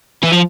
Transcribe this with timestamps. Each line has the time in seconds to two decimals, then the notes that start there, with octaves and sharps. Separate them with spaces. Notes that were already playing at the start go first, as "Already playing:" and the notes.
0.24 E3
0.32 F3